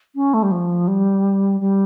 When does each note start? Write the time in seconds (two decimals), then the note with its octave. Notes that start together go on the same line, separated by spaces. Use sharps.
0.15 C#4
0.33 A3
0.42 G3
0.51 F3
0.87 G3
1.60 G3